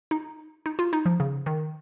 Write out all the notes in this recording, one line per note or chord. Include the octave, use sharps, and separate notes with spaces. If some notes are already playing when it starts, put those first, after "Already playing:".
D#4
D#4
F4
D#4
F3
C#3
D#3